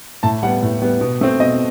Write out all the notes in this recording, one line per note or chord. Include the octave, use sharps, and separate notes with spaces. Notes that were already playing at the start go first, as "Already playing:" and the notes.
A2 A5
G3 B3 F#5
A2
G3 B3
B2
A3 C4
B2 D#5